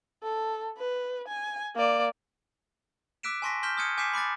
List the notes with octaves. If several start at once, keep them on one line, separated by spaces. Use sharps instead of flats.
A4
B4
G#5
A#3 D5
D6 E6 F#6 B6 D7 E7
G#5 A5 C6 C#6 A#6 B6
C6 F6 G6 B6 E7 G7
D#6 F6 G6 G#6 C#7 D#7
G#5 D6 G6 B6 C7 E7
B5 D6 F#6 A6